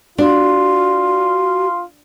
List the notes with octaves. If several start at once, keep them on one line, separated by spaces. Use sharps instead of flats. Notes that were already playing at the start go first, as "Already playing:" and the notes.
D4 F4 F#4